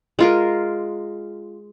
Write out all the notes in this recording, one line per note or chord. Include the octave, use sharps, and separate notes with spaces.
G#3 F4 A#4